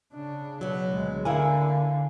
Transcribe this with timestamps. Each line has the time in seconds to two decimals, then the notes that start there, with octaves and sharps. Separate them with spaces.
0.13 C#3 D4
0.61 B2 F#3
0.91 D2 G#3
1.25 D3 A#3 E4 F5 G#5